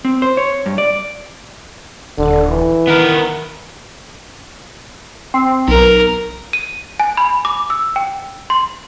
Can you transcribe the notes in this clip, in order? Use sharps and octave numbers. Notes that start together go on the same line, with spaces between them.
C4
C5
C#5
G2
D5
D#1 D3
E3
D#3 B3 A#4
C4
B1 A#4
D#7
G#5
B5
D6
E6
G5
C6